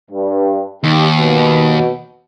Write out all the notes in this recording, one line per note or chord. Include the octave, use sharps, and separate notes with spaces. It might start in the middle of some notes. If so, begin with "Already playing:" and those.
G2
D#2 D#4 G4
B2